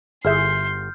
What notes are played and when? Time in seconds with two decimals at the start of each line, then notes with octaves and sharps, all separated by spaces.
0.25 G1 E4 G#4 E5 C6 F6 G6